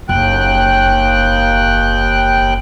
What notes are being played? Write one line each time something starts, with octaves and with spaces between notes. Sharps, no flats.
F#1 D#2 G5 F#6